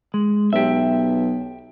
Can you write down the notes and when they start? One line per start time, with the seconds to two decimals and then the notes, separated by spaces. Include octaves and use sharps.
0.14 G#3
0.53 B1 G4 E5